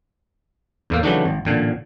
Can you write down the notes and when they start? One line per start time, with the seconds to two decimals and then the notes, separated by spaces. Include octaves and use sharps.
0.90 E2 A2 A#3
1.03 C#3 E3 F#3 A3 D4 D#4
1.25 G#1
1.45 A1 A#2 D3